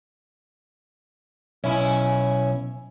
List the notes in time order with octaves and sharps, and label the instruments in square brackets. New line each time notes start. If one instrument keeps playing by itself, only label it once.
[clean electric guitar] B1 [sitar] C#4 E4